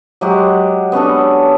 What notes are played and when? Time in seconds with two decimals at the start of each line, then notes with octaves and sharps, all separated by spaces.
0.21 F#3 G#3 G4 F#5
0.92 B3 C#4 D4 A4